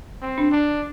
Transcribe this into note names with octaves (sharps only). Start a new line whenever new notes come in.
C4
D4
D4